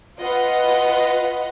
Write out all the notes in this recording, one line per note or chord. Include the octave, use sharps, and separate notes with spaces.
F4 B4 D#5 F#5